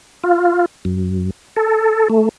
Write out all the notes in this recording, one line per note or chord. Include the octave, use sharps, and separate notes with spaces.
F4
F#2
A4
A3